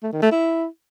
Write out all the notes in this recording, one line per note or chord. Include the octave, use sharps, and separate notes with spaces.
A3
D#3
A3
E4